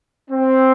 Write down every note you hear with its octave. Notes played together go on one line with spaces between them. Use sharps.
C4